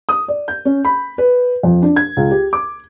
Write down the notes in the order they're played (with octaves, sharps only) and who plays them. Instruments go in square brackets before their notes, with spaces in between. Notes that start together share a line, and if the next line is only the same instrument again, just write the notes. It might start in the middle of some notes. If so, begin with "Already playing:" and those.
[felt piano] D#6
D5
G6
C#4
B5
B4
F2
D4
G#6
C#2
G4
D6